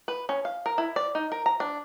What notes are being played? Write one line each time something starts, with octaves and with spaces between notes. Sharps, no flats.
B4
C#4
F5
A#4
E4
D5
D#4
A#4
A#5
D4